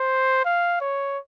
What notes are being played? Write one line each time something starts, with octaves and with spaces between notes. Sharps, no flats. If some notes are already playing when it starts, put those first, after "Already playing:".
Already playing: C5
F5
C#5